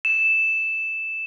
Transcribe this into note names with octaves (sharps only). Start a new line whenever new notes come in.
E7